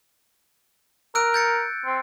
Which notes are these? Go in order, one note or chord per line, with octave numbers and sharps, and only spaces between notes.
A#4 E6 F#6 D7
G6 A6 C#7
C4